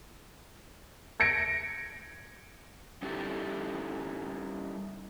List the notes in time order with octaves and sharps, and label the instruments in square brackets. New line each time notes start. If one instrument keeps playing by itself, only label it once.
[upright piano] G#6 A#6 C#7 D7
[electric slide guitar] G3 C#4 D#4 E4 G4 A4